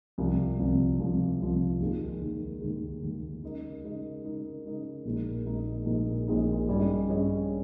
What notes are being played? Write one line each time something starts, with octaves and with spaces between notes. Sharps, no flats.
C2 C3 F3
C2 C3 F3
C2 C3 F3
C2 C3 F3
D#2 D#3 G#3
D#2 D#3 G#3
D#2 D#3 G#3
D#2 D#3 G#3
C#3 G#3 D#4 A#4 D#5
C#3 G#3 D#4 A#4 D#5
C#3 G#3 D#4 A#4 D#5
C#3 G#3 D#4 A#4 D#5
A#1 A#2 G#3 D#4 A#4
A#1 A#2 G#3 D#4 A#4
A#1 A#2 G#3 D#4 A#4
A#1 A#2 G#3 D#4 A#4
G2 G3 C#4 G#4 D#5
G2 G3 C#4 G#4 D#5